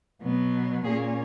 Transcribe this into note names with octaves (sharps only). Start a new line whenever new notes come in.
B2 F#3 B3
A#2 A#3 C#4 G#4